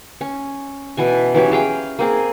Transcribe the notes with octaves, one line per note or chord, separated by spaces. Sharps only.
C#4
B2 E3 G#5
E3 F#3 C#4 G4
G#4 F5 G5
A#3 C4 G#4